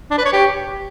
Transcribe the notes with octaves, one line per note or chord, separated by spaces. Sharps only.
D4
B4
C#5
G4